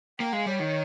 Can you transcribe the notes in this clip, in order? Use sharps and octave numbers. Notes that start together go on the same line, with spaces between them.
A#3 G5
G#3 F5
G3 C#5
D#3